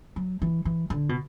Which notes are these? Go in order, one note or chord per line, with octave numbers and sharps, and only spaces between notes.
F#3
E3
E3
D3
B2